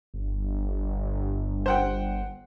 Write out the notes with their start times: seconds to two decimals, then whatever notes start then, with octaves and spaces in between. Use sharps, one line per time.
0.14 G1
1.66 C5 F#5 G5